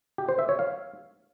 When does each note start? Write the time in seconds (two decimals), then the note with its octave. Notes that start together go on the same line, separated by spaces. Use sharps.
0.18 G4
0.29 C5
0.39 E5
0.49 C#5
0.59 F5